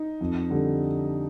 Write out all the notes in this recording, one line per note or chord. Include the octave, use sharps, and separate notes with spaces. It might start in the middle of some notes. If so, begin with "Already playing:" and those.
Already playing: D#4
F2
D3 G3